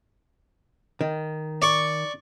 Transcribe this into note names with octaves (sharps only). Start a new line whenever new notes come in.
D#3
D5 C#6